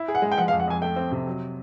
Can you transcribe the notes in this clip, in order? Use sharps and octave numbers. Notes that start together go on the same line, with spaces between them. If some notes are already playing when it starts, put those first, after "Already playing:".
Already playing: E4
G#4
F#5
G#3
G5
F3 F#5
F5
F2
F#5
F2 G#5
A3 G5
C4
C3
F#3